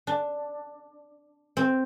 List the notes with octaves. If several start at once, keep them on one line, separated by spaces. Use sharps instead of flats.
D4
C4